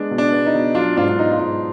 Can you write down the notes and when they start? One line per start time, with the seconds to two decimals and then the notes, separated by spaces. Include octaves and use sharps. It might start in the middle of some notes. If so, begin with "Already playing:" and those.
Already playing: G#3 B3 D4
0.11 B2
0.18 D4
0.32 B3
0.46 D#4
0.54 B2
0.75 F#3 D4 F4
0.97 G#2 D4 F4
1.08 D4
1.18 B3 D#4
1.32 F4
1.39 G#2 D#4